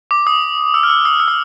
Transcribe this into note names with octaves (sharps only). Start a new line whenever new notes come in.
D6
D#6
E6
F6
E6
D#6
E6
D#6